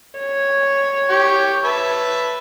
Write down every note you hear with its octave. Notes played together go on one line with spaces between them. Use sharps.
C#5
G4 C#6
B4 E5 A5